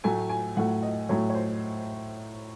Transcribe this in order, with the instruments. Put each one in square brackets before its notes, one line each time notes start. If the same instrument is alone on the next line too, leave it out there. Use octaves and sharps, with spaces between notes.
[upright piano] A2 F#3 A3 G#5
G#5
A2 F#3 A3 F#5
D#5
A2 F#3 A3 C#5
C#5
C5